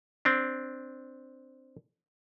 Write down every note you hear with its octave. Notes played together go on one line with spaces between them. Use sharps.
C4 D4